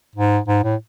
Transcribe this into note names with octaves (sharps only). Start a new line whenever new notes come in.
G#2
G#2
A2